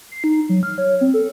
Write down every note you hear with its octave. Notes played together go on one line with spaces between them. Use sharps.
C7
D#4
F#3
F6
C#5
C4
A4